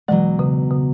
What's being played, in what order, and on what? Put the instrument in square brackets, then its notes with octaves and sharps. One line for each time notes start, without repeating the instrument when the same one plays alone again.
[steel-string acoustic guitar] E2 B2 F#3 [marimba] E3 G#3
[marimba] C#3
C#3